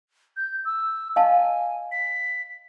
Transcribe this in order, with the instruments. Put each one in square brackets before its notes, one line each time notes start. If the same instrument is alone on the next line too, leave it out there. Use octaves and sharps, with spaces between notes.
[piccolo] G6
E6
[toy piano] D#5 F5 A5 [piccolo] G#5
[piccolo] B6